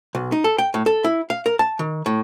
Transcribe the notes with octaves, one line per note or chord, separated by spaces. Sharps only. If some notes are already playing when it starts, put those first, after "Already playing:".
B1
D#4
A4
G5
A2
A4
E4
F5
A#4
A5
D#3
A2